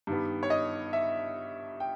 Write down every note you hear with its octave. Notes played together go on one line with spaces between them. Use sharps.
G2 D#3 G3 B3
C#5
D#5
E5
G5